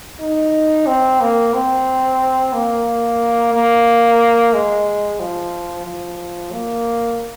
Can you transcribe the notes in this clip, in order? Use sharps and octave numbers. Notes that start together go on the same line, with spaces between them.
D#4
C4
A#3
C4
A#3
A#3
G#3
F3
F3
A#3